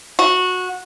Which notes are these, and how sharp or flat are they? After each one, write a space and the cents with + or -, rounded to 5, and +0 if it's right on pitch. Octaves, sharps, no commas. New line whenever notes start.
F#4 -15